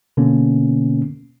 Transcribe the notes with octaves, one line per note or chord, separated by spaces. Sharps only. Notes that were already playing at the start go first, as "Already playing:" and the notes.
B2 D3 A#3 B3 C#4